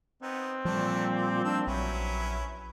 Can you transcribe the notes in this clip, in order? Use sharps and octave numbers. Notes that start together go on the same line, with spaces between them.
B3 C4 D#4
A#2 F3 G3 A3 D4
G4 D6
D#3 A#3 D4 E6
A#1 F#3 C#4 E4 B4